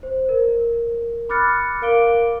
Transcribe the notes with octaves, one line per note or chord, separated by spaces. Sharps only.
C5
A#4
B5 D6 F6 F#6 A6 C#7
A#4 F5 D6 D7 G7